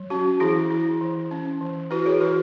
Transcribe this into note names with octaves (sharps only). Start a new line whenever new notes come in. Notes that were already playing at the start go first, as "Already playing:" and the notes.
Already playing: F#3
C#4 F#4
E3 E4 G#4
E4
E3
C#4
E3
E4 F#4 B4
G#4 C#5
E3 F#4 B4